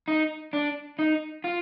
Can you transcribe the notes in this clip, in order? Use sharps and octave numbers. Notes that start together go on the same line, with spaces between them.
D#4
D4
D#4
F4